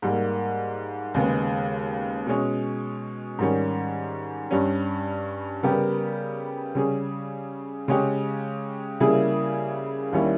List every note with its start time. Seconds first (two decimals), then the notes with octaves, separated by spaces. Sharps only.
0.02 G#2 G3 A#3
1.14 D#2 C#3 G#3 B3
2.27 B2 G#3 C#4
3.39 G#2 D#3 G3 C#4
4.51 G2 G3 C#4
5.63 C#3 G3 B3 G4 A#4
6.75 C#3 G3 C#4 G#4
7.88 C#3 G#3 C#4 G4
9.00 C#3 G3 A#3 E4 G#4
10.12 D#2 D#3 G3 C#4 E4